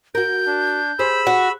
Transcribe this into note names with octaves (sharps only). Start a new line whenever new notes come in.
F#4 A#4 G6
D4
G4 G#4 C5 B5 E6
F#4